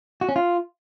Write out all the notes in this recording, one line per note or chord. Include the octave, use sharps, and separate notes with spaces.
F#4
C#4
F4